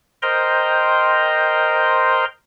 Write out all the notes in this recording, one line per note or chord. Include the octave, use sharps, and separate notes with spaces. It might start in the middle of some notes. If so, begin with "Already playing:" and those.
A#4 C5 D#5 G5 A#5 C6